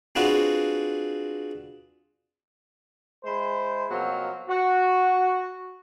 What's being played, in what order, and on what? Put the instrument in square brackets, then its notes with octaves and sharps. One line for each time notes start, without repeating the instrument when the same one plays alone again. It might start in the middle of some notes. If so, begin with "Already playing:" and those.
[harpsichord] C4 D4 F4 F#4 G#4 B4
[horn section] G#3 E4 C5
B2 F3 F#3 A#3 C4
F#4